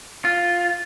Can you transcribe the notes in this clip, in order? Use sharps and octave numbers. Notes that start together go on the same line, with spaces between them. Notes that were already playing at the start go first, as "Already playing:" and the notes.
F4